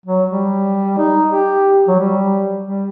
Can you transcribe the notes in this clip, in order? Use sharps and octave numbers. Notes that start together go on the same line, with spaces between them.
F#3
G3
D#4
G4
F#3
G3
G3